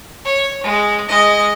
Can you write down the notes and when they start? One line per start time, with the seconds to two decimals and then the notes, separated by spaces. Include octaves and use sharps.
0.25 C#5
0.63 G#3
1.09 G#3 D#5